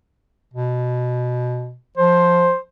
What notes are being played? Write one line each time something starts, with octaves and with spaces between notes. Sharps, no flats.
B2
F3 C5